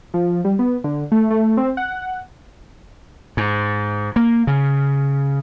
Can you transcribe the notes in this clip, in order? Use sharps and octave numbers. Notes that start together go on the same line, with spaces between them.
F3
G3
B3
D3
A3
A3
C4
F#5
G#2
A#3
C#3